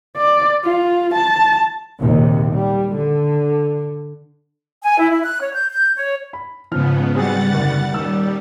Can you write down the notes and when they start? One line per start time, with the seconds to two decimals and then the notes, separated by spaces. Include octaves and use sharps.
0.17 D5
0.64 F4
1.14 A5
1.99 A#1 D#2 C3
2.55 G3
2.96 D3
4.83 G#5
4.99 E4
5.11 E4
5.24 F#6
5.41 C#5
5.54 G6
5.72 G6
5.96 C#5
6.33 B5
6.72 G#2 C#3 F3 B3 F6
7.15 F#3 G3 C4 G#4 F#5 A6
7.52 F#1 D2
7.92 D#1 D#2 G3 E6